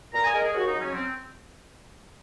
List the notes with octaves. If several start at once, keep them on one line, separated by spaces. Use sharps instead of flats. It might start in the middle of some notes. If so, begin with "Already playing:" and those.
A#2 A#5
G#5
G#3 A#4
G#4
D#2 F#4
D#4
C#3 F#3
C#4
C4